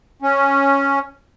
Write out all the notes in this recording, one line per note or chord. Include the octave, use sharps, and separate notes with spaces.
C#4